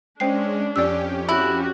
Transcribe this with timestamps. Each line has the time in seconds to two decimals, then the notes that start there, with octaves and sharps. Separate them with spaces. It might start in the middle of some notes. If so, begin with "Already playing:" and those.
0.20 G#3 C#4 D4 C5 G5 C7
0.76 F2 C#4 G4 D5 E6
1.29 E4 F#4